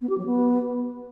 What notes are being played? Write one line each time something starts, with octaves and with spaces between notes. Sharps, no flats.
B3
G4
F#3
B3